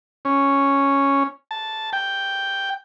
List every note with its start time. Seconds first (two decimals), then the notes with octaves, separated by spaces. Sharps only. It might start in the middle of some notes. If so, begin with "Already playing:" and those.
0.25 C#4
1.51 A5
1.93 G5